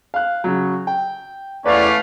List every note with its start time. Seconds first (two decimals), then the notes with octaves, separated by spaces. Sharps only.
0.14 F5 F#6
0.44 C#3 F#3
0.87 G5
1.66 E2 A3 C#4 B4 D5 F5